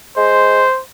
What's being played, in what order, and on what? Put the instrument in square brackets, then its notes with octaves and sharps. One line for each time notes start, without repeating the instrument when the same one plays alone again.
[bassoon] G#3 [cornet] C5